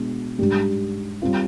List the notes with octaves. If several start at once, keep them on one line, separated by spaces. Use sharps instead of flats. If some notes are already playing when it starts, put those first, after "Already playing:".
Already playing: B2 G#3 D4
G#2 G3 D4 G4
G3 C4 F4